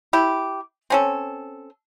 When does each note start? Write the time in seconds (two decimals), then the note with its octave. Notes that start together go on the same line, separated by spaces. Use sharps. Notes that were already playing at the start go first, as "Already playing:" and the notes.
0.13 E4 G4
0.90 C4 C#4 A4